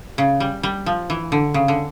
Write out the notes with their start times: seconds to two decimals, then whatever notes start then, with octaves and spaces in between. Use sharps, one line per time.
0.18 C#3
0.40 G3
0.63 G3
0.86 F3
1.10 E3
1.32 D3
1.54 C#3
1.68 D3